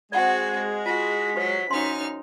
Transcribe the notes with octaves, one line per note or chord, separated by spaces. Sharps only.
G#3 C4 F#4 D5 F#5 G#6
F4 F#4 B6
F#3 G4 C5 D#5
F#2 D#4 C6 F6